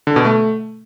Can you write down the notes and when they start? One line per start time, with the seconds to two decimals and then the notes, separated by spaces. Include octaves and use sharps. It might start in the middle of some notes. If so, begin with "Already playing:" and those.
0.07 D3
0.16 B2
0.25 A3